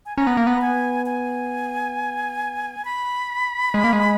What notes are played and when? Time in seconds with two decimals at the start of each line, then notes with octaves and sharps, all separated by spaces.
0.06 G#5
0.17 C#4 A#5
0.27 B3
0.37 A#3
0.47 B3
0.61 G#5
1.06 G#5
2.85 B5
3.74 G#3
3.84 A#3
3.93 G#3